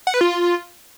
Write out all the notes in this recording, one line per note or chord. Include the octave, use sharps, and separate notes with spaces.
F#5
B4
F4